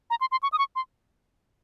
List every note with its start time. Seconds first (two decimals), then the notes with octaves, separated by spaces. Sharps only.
0.10 A#5
0.21 C6
0.31 C6
0.43 C#6
0.52 D#6
0.58 C#6
0.76 C6